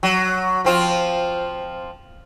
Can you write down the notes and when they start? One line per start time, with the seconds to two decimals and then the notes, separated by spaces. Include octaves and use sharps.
0.03 F#3
0.64 F3 C4 F4